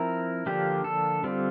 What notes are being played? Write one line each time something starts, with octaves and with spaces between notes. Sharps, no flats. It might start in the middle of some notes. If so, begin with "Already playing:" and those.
Already playing: F3 C4 E4 A#4
D3 F3 A#3 D4 F4 G4
A4
D3 G3 C4 F4